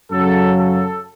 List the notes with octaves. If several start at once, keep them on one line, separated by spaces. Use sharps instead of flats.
F#2 C#3 F#3 A4
A4